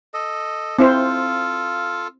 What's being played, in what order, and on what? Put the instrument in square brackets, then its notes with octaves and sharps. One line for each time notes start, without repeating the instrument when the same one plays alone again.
[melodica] A4 D#5
[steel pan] C4 E4 C5 [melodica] F4 A4 F5